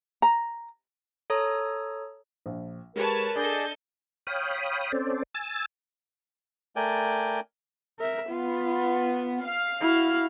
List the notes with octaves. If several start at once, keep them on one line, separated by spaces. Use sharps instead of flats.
A#5
A4 C#5 A#5 D#6
A#1
G#3 G4 A#4 B4 C#5 A5
D4 G#4 A4 D5 D#5 G6
C#5 F5 G5 B5 D#6
C4 C#4 A4 C5 D5
G#5 E6 A6
A3 A#4 D5 G5 G#5
A#4 E5
B3 F4
F5
E4 F#4